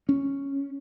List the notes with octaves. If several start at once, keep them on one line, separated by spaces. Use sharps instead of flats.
C#4